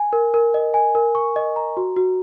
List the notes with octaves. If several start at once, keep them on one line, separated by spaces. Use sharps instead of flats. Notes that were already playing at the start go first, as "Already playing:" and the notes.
Already playing: G#5
A#4
A#4
D#5
G#5
A#4
C#6
D#5
A#5
F#4
F#4